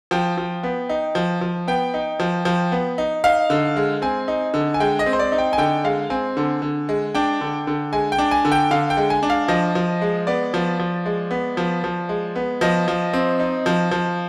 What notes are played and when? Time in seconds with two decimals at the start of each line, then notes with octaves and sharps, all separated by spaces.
0.11 F3 G5
0.38 F3
0.63 B3
0.89 D#4
1.15 F3
1.41 F3
1.68 B3 G5
1.94 D#4
2.20 F3
2.45 F3
2.72 B3
2.98 D#4
3.24 D#4 F5
3.50 D3
3.76 G#3
4.02 C4 G#5
4.28 D#4
4.54 D3
4.74 G#5
4.80 G#3 G5
4.99 D#5
5.06 C4
5.13 C5
5.19 D5
5.32 D#4
5.38 G5
5.53 G#5
5.58 D3 G5
5.84 G#3 F5
6.10 C4 G#5
6.37 D3
6.62 D3
6.89 G#3
7.15 D4 G5
7.41 D3
7.67 D3
7.93 G#3 G#5
8.12 G5
8.19 D4
8.31 G#5
8.45 D3
8.52 G5
8.71 D3 F5
8.90 G5
8.97 G#3
9.10 G#5
9.23 D4
9.30 F5
9.48 F3 D#5
9.75 F3
10.02 G#3
10.27 B3 D5
10.54 F3
10.79 F3
11.06 G#3
11.31 B3
11.57 F3
11.84 F3
12.09 G#3
12.36 B3
12.61 F3 D#5
12.88 F3
13.13 C4
13.39 D#4
13.66 F3
13.91 F3